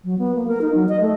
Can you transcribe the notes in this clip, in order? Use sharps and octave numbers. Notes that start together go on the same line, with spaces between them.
F#3
B3
A#3
A#4
D#4
F#3
D#5
A3